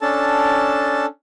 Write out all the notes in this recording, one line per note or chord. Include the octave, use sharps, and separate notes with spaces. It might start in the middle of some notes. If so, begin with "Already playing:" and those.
C#4 D4 A4 A5